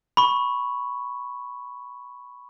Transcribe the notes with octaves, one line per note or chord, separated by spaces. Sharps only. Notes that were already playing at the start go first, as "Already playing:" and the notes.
B5 C#6